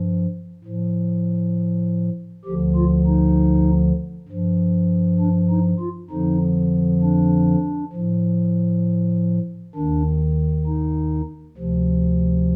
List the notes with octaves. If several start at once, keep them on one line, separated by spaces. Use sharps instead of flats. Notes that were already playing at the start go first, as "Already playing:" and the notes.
Already playing: G2 F3
A2 F3
D2 D3 F3 G4
F4
D#4
G2 F3
D4
D#4
F4
F2 D3 F3 D#4
D4
A2 F3
D#2 D#3 D4
D#4
D2 C3 F3